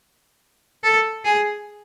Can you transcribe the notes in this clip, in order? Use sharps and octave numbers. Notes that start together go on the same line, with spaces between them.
A4
G#4